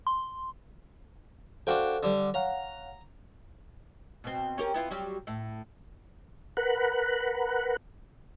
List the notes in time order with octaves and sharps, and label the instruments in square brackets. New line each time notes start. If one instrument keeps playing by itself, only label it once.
[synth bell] C6
[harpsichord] D4 F#4 G5 [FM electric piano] A4 C5 F5
[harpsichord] D3 G3
[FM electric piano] C#5 F5 F#5 [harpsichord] A#5
[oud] B2 C4
C#4 G4 A#4
B3 E4 F4
F#3 G3 G4
A2
[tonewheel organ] A#4 B4 F#5